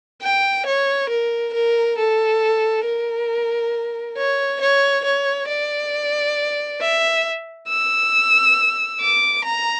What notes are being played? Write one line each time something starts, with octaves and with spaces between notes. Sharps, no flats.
G5
C#5
A#4
A#4
A4
A#4
C#5
C#5
C#5
D5
E5
E6
D6
A#5